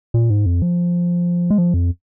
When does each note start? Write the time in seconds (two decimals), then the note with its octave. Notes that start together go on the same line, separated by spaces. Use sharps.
0.14 A#2
0.30 G#2
0.46 F2
0.62 F3
1.50 G#3
1.58 F3
1.74 F2